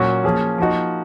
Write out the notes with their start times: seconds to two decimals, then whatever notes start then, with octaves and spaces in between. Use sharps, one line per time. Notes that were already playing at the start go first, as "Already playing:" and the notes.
Already playing: A#2 F#3 C#4 F#4
0.24 F3 A#3 C#4 G#4
0.58 F3 A#3 D#4 F#4